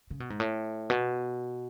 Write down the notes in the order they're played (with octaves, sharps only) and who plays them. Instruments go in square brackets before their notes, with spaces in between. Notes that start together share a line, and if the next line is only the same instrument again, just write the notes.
[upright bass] C#3
B2
G#2
A2
B2